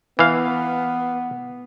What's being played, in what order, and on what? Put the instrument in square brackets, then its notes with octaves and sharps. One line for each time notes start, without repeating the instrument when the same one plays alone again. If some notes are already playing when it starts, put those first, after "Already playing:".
[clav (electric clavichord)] E3 F5 [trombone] B3